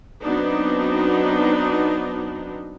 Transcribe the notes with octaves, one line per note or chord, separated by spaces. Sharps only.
F#3 B3 C4 D4 D#4